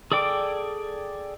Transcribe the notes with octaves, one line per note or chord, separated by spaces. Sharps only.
G#4 A4 D5 G5 D6